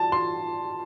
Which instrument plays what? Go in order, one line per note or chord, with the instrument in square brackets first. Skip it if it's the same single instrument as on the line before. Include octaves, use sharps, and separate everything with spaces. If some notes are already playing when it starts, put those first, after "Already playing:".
Already playing: [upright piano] A5
C6